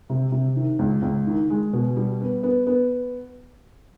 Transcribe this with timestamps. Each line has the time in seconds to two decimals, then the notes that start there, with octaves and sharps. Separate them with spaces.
0.10 C3
0.32 C3
0.56 D#3
0.79 C#2
1.02 C#2
1.27 D#3
1.50 G#3
1.73 B2
1.96 G3
2.20 B3
2.43 B3
2.67 B3